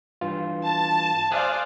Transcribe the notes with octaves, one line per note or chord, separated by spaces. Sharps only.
G2 E3 F4
A5
C5 D5 F5 G#5 D#6 F#6